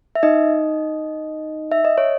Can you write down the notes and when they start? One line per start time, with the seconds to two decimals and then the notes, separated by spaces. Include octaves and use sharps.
0.15 E5
0.23 D#4 D#5
1.72 E5
1.85 D#5
1.98 C#5